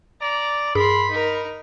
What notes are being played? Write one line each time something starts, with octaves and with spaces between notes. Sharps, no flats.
D5 A#5
G2 G#4 A#4 B5 C6
D#4 A#4